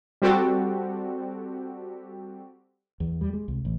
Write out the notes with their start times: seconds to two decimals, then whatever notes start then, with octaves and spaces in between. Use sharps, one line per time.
0.22 G3 C4 F#4 G4 A4
3.00 E2
3.21 G3
3.33 G#3
3.48 C2
3.65 A1